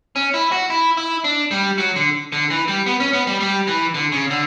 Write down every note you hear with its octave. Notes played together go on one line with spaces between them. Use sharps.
C#4
E4
F#4
E4
E4
D4
G3
F#3
D3
D3
E3
G3
B3
C#4
B3
G3
G3
E3
D3
C#3
D3